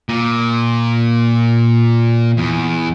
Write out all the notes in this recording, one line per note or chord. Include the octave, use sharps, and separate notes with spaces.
A#2
E2